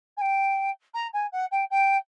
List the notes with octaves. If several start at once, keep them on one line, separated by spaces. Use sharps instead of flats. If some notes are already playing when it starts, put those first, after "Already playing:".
G#5
G5
A#5
G#5
F#5
G5
G5